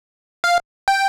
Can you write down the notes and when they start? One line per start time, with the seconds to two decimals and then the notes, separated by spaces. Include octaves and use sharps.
0.44 F5
0.88 G5